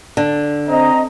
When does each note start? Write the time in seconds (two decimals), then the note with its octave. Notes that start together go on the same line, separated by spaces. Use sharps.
0.17 D3
0.69 C4 D#5 A#5